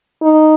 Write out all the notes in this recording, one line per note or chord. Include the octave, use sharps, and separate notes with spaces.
D#4